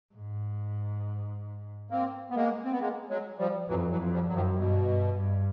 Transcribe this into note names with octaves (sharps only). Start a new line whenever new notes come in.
G#2
A#3 C4
B3
G#3 A#3
C4
B3
G#3 A#3
F#3 G#3
F3 G3
F2 E3 F#3
E3 F#3
F2
F3 G3
F#2 F#3
D#3 F3
G2 B2
G2
G2